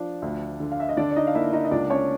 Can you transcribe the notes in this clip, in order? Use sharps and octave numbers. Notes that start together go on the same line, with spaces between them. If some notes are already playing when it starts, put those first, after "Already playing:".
Already playing: F3 D4
D2
D3
F5
E5
D#5
D3 D4 D5
D5
D#4 D#5
F5
A#3 E4 E5
D#4 D#5
D#5
C#2 D4 D5
C#4 C#5